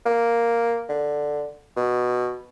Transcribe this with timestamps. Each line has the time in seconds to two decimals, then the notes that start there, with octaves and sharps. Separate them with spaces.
0.05 A#3
0.89 D3
1.76 B2